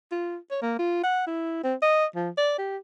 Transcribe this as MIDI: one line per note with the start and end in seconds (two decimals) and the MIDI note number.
0.12 0.37 65
0.51 0.61 73
0.62 0.77 58
0.79 1.00 65
1.04 1.27 78
1.27 1.64 64
1.64 1.75 60
1.83 2.06 75
2.16 2.30 53
2.38 2.56 74
2.59 2.77 67